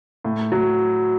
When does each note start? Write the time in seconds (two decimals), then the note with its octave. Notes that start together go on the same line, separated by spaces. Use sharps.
0.24 A2
0.52 F#3